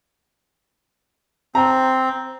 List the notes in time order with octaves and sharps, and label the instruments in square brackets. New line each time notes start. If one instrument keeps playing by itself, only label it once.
[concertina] C4 [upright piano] A#5